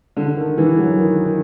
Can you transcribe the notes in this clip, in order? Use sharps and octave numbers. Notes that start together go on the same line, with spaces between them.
D3
D#3
E3
F#3
D#3
D#3